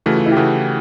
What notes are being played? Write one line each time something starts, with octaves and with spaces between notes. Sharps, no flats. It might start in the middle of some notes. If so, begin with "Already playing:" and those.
C#3 E3 A3 F#4
F4
E4
G4
C#3 E3 A3 F#4